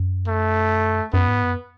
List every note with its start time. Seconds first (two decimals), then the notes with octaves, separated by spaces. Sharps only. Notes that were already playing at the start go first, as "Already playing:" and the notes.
Already playing: F#2
0.28 A3
1.14 F#2 B3
1.28 G#2
1.43 F#2